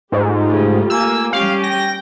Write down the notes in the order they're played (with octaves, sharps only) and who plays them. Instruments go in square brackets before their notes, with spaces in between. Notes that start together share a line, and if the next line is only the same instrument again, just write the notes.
[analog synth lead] G#2 [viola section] A3 F4 G4
[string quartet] C#3
[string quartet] A#3 G#5 [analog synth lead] E6
[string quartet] G3 C#4 G4 [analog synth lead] F5
[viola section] G5 [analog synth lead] A#6